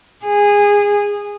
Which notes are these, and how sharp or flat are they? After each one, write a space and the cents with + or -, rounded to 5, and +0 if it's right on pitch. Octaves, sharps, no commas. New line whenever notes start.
G#4 -20